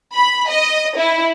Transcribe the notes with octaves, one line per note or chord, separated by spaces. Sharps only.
B5
D#5
E4